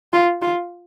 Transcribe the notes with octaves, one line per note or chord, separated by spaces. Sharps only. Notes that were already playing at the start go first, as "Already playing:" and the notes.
F4
F4